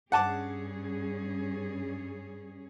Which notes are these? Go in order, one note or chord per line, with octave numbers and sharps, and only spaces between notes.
G2 C#4 G#4 F#5 A5 D6